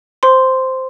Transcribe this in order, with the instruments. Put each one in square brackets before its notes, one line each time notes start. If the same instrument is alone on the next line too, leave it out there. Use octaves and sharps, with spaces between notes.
[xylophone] C5 C6